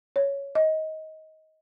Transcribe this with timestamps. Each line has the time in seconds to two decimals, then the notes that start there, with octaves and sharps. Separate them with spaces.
0.16 C#5
0.55 D#5